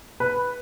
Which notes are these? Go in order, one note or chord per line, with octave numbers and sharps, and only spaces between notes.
B4